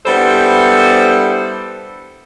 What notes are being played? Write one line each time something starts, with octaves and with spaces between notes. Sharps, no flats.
G3 B3 D4 E4 A4 C5